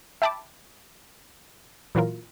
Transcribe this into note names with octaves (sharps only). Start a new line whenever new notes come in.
E5 G5 A5 B5 D6
A#2 E3 F#3 F4 A#4